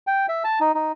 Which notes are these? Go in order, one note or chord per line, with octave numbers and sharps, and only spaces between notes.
G5
E5
A5
D#4
D#4